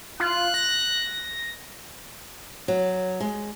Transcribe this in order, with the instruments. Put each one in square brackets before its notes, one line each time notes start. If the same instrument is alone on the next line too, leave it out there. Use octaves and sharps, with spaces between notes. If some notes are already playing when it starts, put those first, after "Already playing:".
[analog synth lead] F4 [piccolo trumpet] F#6
[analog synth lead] A#6
[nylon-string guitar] F#3
G#3